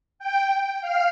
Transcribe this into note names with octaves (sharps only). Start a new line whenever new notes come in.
G5
F5